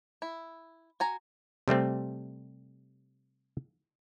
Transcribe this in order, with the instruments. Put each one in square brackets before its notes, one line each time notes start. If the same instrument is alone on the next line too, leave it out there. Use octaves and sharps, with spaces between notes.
[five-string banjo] E4
F#4 G#5 A#5
[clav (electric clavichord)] C3 G3 A3 C4